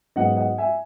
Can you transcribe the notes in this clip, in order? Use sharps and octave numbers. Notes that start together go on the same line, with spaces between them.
G#2 F#3 B3 D#5 F#5
D#5 F#5
E5 G#5